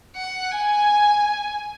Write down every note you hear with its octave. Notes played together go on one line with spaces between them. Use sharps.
F#5
G#5